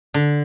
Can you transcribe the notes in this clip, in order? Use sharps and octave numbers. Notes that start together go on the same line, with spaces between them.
D3